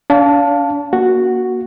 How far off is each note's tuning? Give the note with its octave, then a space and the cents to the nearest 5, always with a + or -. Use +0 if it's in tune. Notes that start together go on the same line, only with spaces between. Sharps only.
D4 -45 F5 +0 A5 +0
A#3 +25 F#4 +0